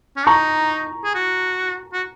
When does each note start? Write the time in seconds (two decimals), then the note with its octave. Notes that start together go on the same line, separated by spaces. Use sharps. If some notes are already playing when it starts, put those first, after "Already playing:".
0.16 C#4
0.26 D#4 A#5 C#6
1.05 G#4
1.15 F#4
1.93 F#4